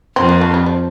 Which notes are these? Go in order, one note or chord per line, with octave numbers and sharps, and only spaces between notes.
F2 C4
A#3
A3
G3
F3